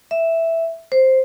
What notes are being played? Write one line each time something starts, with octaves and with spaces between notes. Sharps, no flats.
E5
C5